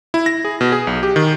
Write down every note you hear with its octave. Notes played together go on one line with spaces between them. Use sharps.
E4
A#6
G#4
B2
G#4
B1
G4
D#3